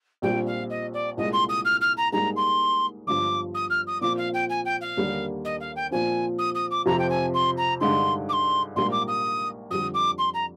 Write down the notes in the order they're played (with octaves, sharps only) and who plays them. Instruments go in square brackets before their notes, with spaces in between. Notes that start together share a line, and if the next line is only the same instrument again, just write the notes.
[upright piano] A#1 A#2 G3 C4 [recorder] G5
[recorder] F5
D#5
D5
[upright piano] C2 A#2 G#3 [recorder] D#5
[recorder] C6
D#6
F6
F6
A#5
[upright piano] G#2 G3 A#3 D#4 G#4 [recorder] A#5
[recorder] C6
[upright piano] G1 G2 F3 [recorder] D6
[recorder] D#6
F6
D#6
[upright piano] A#2 F3 C4 F4 [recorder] D6
[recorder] F5
G5
G#5
G5
F5
[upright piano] D#2 D3 G3 A#3
[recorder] D#5
F5
G5
[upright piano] A#2 F3 C4 [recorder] G#5
[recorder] D#6
D#6
D6
[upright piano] F2 C3 F3 C4 [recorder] A#5
[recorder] G5
G#5
C6
A#5
[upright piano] G2 D3 G#3 D#4 [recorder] C6
[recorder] D6
C6
[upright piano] A#1 G#2 G3 A#3 [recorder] C6
[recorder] D6
D#6
[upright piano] F2 D3 G3 [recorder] D#6
[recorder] D6
C6
A#5